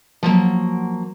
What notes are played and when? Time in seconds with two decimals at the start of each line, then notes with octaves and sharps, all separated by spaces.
0.23 F3 F#3 A#3